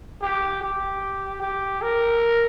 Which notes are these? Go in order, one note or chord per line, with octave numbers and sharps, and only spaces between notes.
G4
G4
G4
A#4